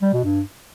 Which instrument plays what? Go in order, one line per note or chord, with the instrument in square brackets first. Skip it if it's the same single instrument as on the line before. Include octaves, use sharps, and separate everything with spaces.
[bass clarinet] G3
B2
G2